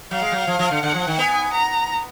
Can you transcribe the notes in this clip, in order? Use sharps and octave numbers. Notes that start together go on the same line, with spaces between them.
F#3 F5
G#3
F#3
F3
F3
D3
D3 F#5
F3
D#3
B3 G#5
A#5